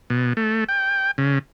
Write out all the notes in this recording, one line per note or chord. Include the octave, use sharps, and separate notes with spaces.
B2
A3
G5
C#3